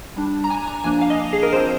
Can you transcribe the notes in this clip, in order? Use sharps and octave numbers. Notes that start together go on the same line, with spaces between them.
G3 D4
A#5
G#5
A#5
F3 A#3 D4 G#5
F5
D#5
G#4
A#4
F3 C4 C5